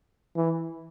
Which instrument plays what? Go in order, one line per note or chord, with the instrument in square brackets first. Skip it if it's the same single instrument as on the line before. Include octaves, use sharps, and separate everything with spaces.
[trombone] E3